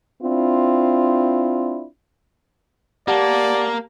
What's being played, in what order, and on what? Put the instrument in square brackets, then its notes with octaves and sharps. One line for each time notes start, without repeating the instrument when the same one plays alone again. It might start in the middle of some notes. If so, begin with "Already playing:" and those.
[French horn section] C4 D4 E4 F4
[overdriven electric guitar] A#3 [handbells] G4 F#5 A5 [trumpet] D5